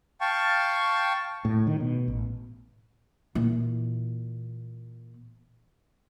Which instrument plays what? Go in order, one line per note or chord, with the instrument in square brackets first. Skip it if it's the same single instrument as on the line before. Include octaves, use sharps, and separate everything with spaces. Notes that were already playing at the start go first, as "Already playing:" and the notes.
[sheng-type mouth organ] F5 G5 A5 C#6
[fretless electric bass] A2
D#3
B2
A1
[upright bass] A#2 E3